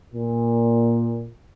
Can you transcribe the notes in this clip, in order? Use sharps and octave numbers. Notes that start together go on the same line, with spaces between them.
A#2